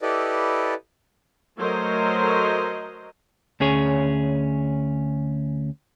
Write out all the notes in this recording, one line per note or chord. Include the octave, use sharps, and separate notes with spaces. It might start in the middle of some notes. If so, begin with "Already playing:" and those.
E4 G4 A4 B4 D5 D#5
F#3 A3 A#4 C5 D#5
D2 C#4 G#4 C#5